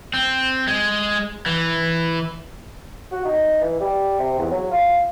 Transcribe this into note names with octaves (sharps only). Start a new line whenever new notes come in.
C4
G#3
E3
F#4
D#4
E3
G3
C3
E2
F#3
F4